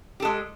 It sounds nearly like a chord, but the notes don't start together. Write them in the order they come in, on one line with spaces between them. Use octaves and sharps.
G4 A4 G#3